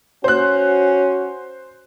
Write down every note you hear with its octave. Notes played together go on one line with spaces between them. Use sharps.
C#4 F#4 C5 F#6